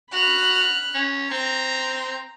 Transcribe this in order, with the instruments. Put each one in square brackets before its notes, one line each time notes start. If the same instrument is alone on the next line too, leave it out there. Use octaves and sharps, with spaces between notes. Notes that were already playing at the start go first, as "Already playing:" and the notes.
[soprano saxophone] F#4 [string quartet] B5 F6 F#6
[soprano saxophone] C#4
[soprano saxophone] C4 [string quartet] A#5